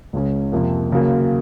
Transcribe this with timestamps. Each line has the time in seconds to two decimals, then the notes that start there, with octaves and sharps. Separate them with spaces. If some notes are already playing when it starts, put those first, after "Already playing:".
0.13 C#2 C#3 G#3 C#4
0.52 F2 C3 F3 A#3
0.90 D#2 C#3 F#3 A#3